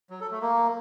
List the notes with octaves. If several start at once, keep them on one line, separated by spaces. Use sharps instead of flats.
F#3
A4
A3
A#3